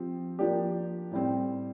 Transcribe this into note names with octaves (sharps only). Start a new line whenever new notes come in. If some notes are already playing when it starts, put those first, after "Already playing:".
Already playing: F3 C4 G4
F3 A#3 D4 G4
A2 G3 C4